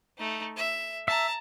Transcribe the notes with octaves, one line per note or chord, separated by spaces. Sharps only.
A3 D#4
E5
E5 A5 A#5